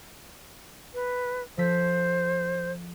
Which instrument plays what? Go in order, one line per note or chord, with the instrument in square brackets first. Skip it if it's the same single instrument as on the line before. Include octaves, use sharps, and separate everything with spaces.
[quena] B4
[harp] F3 A4 B6 [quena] C5